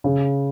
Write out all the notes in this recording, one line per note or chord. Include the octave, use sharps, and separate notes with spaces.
C#3